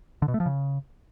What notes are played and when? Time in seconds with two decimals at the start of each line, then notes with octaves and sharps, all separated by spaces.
0.22 D3
0.28 B2
0.34 A3
0.40 F3
0.46 C#3